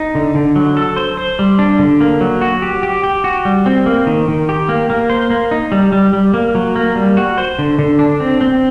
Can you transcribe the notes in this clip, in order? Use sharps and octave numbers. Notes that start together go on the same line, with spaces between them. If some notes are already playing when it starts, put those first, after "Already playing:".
Already playing: D#4
D3
D3
F#3
A4
C5
C5
G3
D4
D3
A#3
F#3
F#4
G4
G4
G4
F#4
G3
C4
A#3
D#3
D#3
G4
A#3
A#3
C5
A#3
D#4
G3
G3
G3
A#3
F#3
A#3
G3
F#4
C5
D3
D3
D4
C4
C4